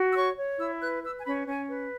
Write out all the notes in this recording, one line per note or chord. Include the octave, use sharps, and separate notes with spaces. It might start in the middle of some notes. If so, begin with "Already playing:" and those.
Already playing: F#4
E6
C#5 C#6
C#5
E4 E6
B4 F#6
B4 E6
G#5
C#4 B5
C#4 G#5
B4